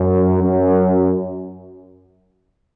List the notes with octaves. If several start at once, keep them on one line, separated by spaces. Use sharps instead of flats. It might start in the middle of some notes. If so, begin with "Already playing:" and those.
Already playing: F#2
F#2